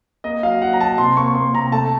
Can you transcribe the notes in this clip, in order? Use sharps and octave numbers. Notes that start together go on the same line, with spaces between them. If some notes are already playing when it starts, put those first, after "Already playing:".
A#3 D#5
F#3 F5
F#3 F#5
A#5
F#3 A5
C3 C6
A#3 C#6
A#3 C6
C3 A#5
A3 A5